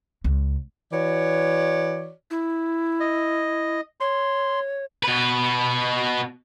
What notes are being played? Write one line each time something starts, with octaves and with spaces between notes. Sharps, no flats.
C#2
E3 F#4 C#5 D5
E4
D#5
C#5 C6
B2 B4